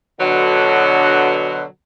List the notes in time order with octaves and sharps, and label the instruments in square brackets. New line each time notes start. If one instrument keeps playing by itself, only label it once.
[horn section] B2 D3 F#3